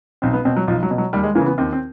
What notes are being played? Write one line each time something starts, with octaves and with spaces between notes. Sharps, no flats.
B1 C4
B3
B2 C4
F#3
B1 F3
F#3
B2
F#3
D#2 G3
G#3
C#3 E3 A#3
B3
D#2 C4
C4